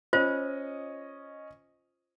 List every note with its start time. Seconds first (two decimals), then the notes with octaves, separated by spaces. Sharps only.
0.13 C#4 F4 C5 D#5